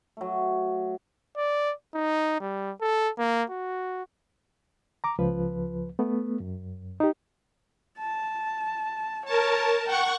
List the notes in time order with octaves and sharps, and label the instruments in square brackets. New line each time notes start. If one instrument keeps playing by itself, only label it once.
[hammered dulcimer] F#3 A3
[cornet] D5
D#4
G3
A4
A#3
F#4
[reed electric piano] A#5 D6
C#2 F3 B4
A3 B3
F#2
D#4 G4
[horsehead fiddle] A5
[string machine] A#4 A5 [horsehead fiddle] C#5
[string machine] F#5 C#6 [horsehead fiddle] G5